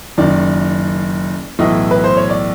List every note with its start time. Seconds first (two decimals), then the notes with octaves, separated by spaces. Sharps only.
0.17 F#1 F#2 D#3 D5
1.59 B1 A2 E3 D#5
1.91 B4
2.04 C5
2.17 C#5
2.30 D5